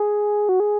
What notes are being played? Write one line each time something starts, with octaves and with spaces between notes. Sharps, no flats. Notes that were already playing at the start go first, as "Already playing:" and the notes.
Already playing: G#4
F#4
G#4